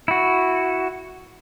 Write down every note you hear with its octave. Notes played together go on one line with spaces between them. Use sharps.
E4 F#4